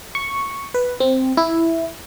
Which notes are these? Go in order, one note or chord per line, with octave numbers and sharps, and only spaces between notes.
C#6
B4
C4
E4